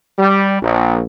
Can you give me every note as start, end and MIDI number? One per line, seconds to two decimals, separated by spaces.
0.19 0.60 55
0.61 1.03 34